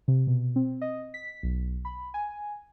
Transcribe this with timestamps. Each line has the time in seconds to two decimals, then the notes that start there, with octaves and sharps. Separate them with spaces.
0.08 C3
0.27 B2
0.56 C4
0.81 D#5
1.14 B6
1.43 B1
1.85 B5
2.14 G#5